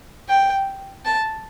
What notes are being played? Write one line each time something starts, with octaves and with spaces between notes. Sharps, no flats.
G5
A5